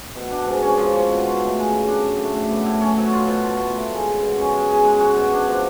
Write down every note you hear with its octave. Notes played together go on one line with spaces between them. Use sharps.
B2
D4
G#2
C#4
F3
C#4
B2
F4
A2
G#3
C#3
D4
F#2
A3
A2
B3
A2
C#4
F#3
F4
B2
F4
A2
A3
G#3
G#4
B2
C#4
G#3
G#4
G#3
F#4
B2
D4
F3